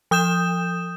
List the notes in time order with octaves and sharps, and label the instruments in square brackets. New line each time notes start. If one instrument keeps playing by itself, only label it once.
[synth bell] F3 D#6 G6 E7